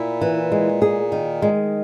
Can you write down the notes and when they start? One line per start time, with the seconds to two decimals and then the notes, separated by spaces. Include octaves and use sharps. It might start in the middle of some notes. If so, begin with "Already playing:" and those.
Already playing: A#2 E4
0.21 E3
0.52 G#3
0.82 G#4
1.12 D#3
1.42 G#3